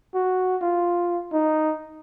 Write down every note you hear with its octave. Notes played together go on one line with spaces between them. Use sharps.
F#4
F4
D#4